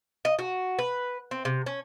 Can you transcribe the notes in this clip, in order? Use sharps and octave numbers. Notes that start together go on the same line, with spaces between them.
D#5
F#4
B4
C4
C3
C#4